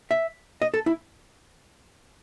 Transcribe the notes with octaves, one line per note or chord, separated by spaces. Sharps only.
E5
D#5
A4
E4